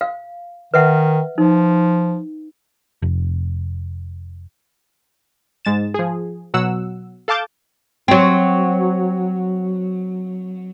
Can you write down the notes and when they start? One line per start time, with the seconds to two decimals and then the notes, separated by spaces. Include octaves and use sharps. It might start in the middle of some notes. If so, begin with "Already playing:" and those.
0.01 F5
0.74 D#3 B4 E5 F#5
1.38 F3 D#4
3.02 F1
5.65 G#2 G#3 A6 E7
5.94 F3 G#4
6.54 B2 F#3 F#5 E6
7.28 A4 F5 A5 D6 G6 A6
8.08 F#3 C4